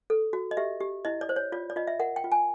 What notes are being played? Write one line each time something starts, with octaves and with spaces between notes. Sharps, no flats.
A4
F#4
D#5
G4 E5
G4
E4 D#5
D5
C5
C#5
F4 D5
D5
F4 D#5
E5
A#4 F#5
G5
F4
G#5